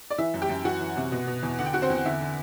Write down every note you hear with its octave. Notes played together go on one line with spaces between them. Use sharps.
D5
E3 E4 E5
F#2
G4 G5
F#2
E3 F#4 F#5
E3
C3
B2
B2
E2
D3 F#5
G5
D3 F#4 F#5
C4 C5
E2
D3 E4 E5
D3